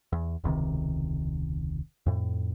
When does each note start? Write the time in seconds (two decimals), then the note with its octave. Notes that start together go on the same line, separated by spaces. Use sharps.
0.13 E2
0.44 E1 C#2 C3 D#3
2.06 F2 A2